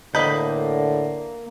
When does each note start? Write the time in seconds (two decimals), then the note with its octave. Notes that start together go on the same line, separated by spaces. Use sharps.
0.15 A2 D3 A#3 B4 D#5 B5 G6